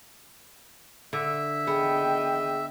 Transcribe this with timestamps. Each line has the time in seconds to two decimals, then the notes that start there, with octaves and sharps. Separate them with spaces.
1.13 D3 E5
1.67 B3 G#4 D#5 G5